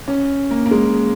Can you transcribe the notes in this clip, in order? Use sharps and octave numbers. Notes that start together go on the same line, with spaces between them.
C#4
A#3
A#3
G#3